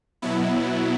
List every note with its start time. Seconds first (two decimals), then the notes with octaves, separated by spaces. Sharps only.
0.22 B2 F#3 B3 E4